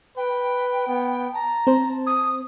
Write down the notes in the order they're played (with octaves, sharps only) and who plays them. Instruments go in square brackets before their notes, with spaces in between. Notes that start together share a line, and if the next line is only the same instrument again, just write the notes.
[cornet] B4 [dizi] G5
[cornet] B3
[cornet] A5 [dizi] A#5
[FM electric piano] C4 C5
[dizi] D#6